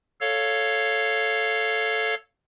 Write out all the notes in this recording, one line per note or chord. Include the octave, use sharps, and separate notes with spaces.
A4 C#5 F5